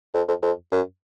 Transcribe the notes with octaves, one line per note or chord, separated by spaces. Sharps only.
F2
F2
F2
F#2